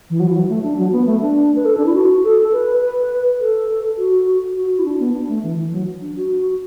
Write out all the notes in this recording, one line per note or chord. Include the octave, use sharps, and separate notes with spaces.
E3
F#3
E3
F#3
A3
D4
F#3
B3
A3
D4
B4
A4
D4
E4
F#4
A4
B4
B4
A4
F#4
F#4
E4
D4
B3
D4
A3
E3
E3
F#3
D4
F#4